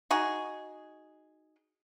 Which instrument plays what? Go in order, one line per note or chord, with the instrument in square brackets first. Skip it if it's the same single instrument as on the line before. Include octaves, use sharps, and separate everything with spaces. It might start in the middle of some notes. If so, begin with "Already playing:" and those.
[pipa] D#4 F#4 G#4